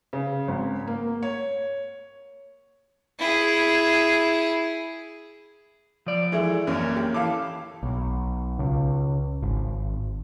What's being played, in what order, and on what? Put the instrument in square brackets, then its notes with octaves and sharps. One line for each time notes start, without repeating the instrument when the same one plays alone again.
[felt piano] C#3
G#1
A#3
C#5
[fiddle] E4 G#4
[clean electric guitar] F3 D5
[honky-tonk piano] E3 G#3 A3
[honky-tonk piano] A1 F#2 [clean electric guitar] A#3 C#4
[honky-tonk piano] G4
[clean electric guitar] E3 A4 [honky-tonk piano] F5 D6
[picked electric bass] B1
C#2
G#1